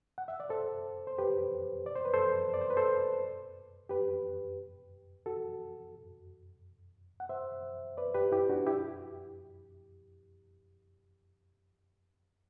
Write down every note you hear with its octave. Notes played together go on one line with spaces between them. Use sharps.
F#5
E5
D5
A4 C5
C5
G4 B4
D5
C5
B4
A4 C5
D5
C5
B4
A4 C5
G4 B4
F#4 A4
F#5
C5 E5
B4 D5
G4 B4
E4 G4
D4 F#4
E4 G4